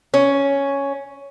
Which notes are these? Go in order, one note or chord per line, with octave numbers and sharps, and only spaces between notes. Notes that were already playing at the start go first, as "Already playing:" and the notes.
C#4